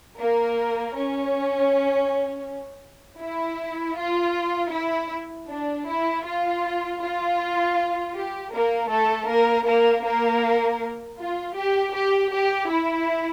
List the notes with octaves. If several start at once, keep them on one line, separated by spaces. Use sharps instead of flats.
A#3 A#4
C#4
E4
F4
E4
D4
E4
F4
F4
G4
A#3 A#4
A3 A4
A#3 A#4
A#3 A#4
A#3 A#4
F4
G4
G4
G4
E4